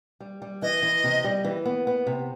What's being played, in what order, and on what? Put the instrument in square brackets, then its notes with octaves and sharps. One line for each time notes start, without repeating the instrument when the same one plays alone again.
[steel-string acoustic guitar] G3
G3
[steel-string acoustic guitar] E3 [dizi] D#5
[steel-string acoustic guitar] E3
C3
G3
E3
B3
B3
C3